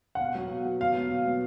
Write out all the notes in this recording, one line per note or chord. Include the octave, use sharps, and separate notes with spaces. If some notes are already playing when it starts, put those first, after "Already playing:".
F#5
B2 F5
F#3 B3 F#4
B2
F#3 B3 F#4
B2 F5
F#3 B3 F#4
B2
F#3 B3 F#4